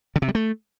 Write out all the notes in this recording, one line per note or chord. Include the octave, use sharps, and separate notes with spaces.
D3
C3
G3
A3